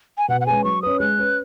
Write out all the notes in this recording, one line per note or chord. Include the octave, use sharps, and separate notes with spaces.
G#5
B2 F#5
F#5
G#3 C#4 G#4 B4 G#5
F#3 C#6
C#4 B4 D#6
G#3 F#6
C#4 B4